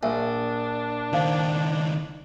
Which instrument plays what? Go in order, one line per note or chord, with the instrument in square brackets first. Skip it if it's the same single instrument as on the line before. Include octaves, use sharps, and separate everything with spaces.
[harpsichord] A#1 [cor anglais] D4 [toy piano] E5 G#5
[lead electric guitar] C#2 D#3 [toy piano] D#4 C5 F5